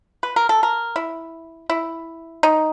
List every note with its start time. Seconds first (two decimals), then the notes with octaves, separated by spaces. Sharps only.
0.23 B4
0.36 A#4
0.49 A4
0.63 A#4
0.96 E4
1.70 E4
2.43 D#4